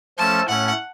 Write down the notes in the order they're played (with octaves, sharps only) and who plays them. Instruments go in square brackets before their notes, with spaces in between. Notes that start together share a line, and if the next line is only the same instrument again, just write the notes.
[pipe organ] F3 A3 C#4 A4 [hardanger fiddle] A5
[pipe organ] A2 A3 C#4 [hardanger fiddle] F#5